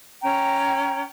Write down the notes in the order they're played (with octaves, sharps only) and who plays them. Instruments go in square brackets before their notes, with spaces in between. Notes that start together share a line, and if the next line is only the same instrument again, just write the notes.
[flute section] C#4 G5 A#5